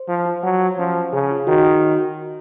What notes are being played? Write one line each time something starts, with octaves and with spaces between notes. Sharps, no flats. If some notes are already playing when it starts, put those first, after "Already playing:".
Already playing: C5
F3 F4
F4
F#3 F#5
C5
F3 C#4
C5
C#3 G#4
F4
D#3 F#4
F#4